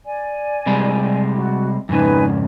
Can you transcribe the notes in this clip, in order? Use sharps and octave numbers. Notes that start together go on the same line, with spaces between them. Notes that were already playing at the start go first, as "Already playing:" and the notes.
D5 G#5
C3 G3 G#3
F#4
F2 G#2 C#3 D#4 B4 G#5